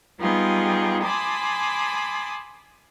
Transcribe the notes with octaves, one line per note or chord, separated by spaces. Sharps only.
G3 B3 D#4 F4 G4 G#4
G#5 A5 B5 C6 D6 D#6